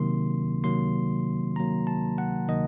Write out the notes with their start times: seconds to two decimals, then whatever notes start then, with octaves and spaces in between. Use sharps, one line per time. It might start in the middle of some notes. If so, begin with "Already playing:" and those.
Already playing: C3 D#3 F#3 A#3 C6
0.64 C3 D#3 F#3 A#3 C6
1.56 C3 D#3 F#3 A#3 A#5
1.87 A5
2.18 F#5
2.48 C3 D#3 F#3 A#3 D#5